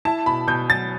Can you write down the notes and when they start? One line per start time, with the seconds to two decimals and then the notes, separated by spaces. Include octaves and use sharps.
0.05 E4 A5
0.26 B2 B5
0.47 B2 G6
0.70 F#3 A6